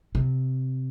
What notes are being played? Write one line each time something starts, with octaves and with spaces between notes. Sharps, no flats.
C3